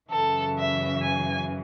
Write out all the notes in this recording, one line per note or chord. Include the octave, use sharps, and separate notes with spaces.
F#2 C#3 E3 A4
E5
G#5